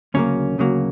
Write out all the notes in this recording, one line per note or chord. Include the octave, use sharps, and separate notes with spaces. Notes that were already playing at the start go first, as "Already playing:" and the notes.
D2 C#3 F#3 A#3 C#4
D2 C#3 F#3 A#3